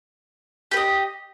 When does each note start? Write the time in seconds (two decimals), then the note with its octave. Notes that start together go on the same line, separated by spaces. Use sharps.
0.71 G4 B4
0.77 D#5